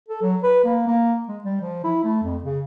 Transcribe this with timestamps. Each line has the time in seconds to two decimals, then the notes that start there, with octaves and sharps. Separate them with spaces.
0.09 A4
0.22 F#3
0.43 B4
0.64 A#3
0.88 A#3
1.28 G#3
1.44 G3
1.62 F3
1.84 E4
2.04 A3
2.23 F2
2.44 C#3